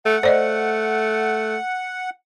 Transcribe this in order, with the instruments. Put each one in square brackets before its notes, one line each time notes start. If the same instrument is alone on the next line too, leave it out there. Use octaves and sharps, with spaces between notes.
[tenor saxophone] A3 [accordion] F#5
[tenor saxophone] A3 [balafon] C5 D5 D#5